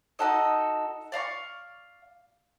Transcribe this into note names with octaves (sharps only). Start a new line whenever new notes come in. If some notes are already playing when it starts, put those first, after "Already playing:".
D#4 F#4 A4 D#5
D5 F5 A#5 C#6